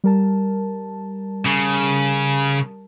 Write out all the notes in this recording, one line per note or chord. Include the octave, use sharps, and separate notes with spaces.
G3 A#4 A5
C#3